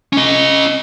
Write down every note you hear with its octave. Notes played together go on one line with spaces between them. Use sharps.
C#4 D#5